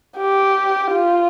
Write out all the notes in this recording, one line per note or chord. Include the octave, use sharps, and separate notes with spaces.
G4
F4